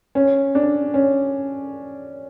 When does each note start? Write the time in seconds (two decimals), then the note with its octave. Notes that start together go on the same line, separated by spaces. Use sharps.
0.15 C#4
0.55 D4
0.94 C#4